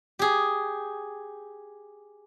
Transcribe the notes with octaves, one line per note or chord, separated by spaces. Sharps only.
G4 G#4